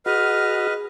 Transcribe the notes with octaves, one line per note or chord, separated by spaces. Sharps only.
F#4 G#4 B4 D#5 F6